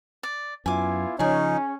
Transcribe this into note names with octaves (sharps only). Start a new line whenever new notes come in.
D5
F#2 B3 E4 F4 G#5 D6
C#3 F3 C#4 D#4 G#4 G#5